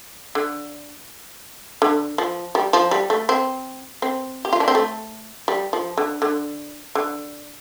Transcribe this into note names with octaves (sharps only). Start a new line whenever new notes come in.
D3
D3
F3
G3
F3
G3
A3
C4
C4
G4
F4
D4
C4
A3
G3
F3
D3
D3
D3